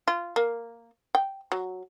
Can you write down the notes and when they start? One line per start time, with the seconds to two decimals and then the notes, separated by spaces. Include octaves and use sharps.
0.08 F4
0.36 A#3
1.15 G5
1.52 F#3